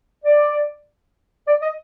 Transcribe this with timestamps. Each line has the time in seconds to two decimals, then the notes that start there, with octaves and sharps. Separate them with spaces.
0.24 D5
1.46 D5
1.62 D#5